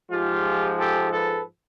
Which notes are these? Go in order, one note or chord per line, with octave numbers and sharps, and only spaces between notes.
G#2 F3 G#3 F4 G4
G4 A4
A4 B4